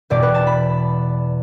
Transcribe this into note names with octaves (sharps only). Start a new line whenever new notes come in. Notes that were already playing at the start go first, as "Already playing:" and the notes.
E2 B2 G3 D5
B4
A5
B5